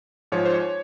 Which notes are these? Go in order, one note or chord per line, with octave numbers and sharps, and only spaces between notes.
G#2 F3 C#5
C5
C#5